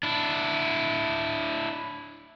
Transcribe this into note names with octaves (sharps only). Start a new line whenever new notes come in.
D4 E4